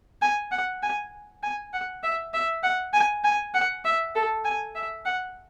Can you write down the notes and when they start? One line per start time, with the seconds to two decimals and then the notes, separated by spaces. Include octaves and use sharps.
0.22 G#5
0.51 F#5
0.83 G#5
1.43 G#5
1.73 F#5
2.03 E5
2.34 E5
2.63 F#5
2.93 G#5
3.24 G#5
3.55 F#5
3.85 E5
4.15 A4
4.45 G#5
4.75 E5
5.05 F#5